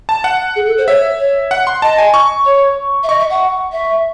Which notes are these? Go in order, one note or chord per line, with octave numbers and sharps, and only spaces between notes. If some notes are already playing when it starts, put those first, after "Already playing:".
A5
F#5
G#4
A4
C5
C#5 E5
C#5
F#5
C6
D#5 A5
G#5
C#6
C#5
E5
D#5 C#6
E5
F#5
E5